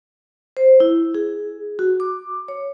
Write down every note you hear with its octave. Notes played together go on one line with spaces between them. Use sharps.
C5
E4
G#4
F#4
D6
C#5